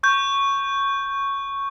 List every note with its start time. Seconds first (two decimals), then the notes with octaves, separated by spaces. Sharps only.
0.03 C#6 G6